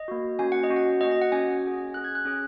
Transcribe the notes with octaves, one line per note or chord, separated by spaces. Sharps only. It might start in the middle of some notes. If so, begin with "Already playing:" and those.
Already playing: D#5
A#3 F#4
A#3 C#4 F#4 G#5
F#5
D#5
C#4 F#4
F#5
A#3 F#4 D#5
D#5
F#5
C#4 F#4 G#5
C#4 G#4
C#4 G#4 F#6
G#6
F#6
C#4 G#4